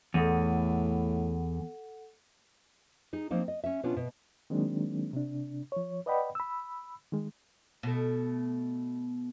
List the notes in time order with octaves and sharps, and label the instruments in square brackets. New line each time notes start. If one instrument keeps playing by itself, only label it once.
[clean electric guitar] E2 [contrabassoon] A2 [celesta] A4 F#5 D#7
[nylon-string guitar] D#4 G#4
F3 A#3 C4 D#4
D#5
C#4 E5
B2 B3 C#4 D4 F4
B2
[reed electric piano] D#3 F#3 G#3 A#3 C4 D4
C3 D4
F3 C#5
B4 D5 D#5 F#5 G5 B5
B5 E6
D#3 G#3
[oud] B2 A3